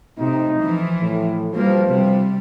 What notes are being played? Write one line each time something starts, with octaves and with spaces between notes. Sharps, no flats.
F2 A2 C3 D#4
E3 F3
A2
B1 G2 F3 G3 A#3
C3 G3